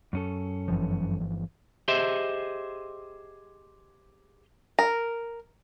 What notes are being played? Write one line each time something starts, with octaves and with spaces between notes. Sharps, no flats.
F#2 C#4 A4
G1 E3 F3
G4 G#4 C5 D#5 E5
A#4